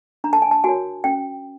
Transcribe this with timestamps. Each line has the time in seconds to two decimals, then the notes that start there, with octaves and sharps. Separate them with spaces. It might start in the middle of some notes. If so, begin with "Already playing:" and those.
0.24 D4 A#5
0.33 A5
0.42 G#5
0.51 A5
0.64 F#4 A#4 C#5 G#5
1.04 C#4 G5